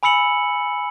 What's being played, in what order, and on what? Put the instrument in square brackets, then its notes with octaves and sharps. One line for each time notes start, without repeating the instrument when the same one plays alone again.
[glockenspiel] G#5 B5 E6 C#7 F#7